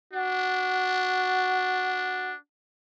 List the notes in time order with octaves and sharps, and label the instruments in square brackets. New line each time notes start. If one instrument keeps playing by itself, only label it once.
[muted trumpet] D4 [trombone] F#4